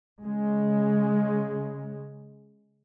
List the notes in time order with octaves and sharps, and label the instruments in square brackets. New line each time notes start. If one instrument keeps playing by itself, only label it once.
[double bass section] C#3 G#3